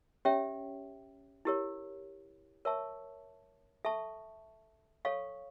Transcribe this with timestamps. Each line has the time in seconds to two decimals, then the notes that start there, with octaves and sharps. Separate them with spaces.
0.25 C#4 G4 C#5 E5 G5
1.45 E4 G4 A#4 C#5
2.65 A#4 C#5 E5 A5 C#6
3.85 A4 E5 A5 C#6
5.05 A4 C#5 F5 C#6